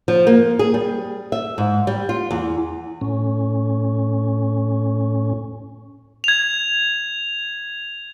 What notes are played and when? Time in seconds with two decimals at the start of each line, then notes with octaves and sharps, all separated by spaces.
0.08 F3
0.27 A#3
0.59 G#4
0.74 G3
1.32 E5
1.58 G#2
1.87 G3
2.09 F4
2.31 E2
3.01 A2 C#4
6.24 G#6 F7